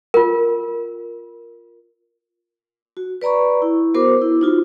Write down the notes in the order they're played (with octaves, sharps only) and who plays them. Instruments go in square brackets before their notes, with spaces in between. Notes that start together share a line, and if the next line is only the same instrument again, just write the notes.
[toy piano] F4 A#4
[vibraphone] F#4
B4 D5 A#5 B5 C#6
E4
B3 F#4 A#4 C5 D6
E4
D#4 F4 F#4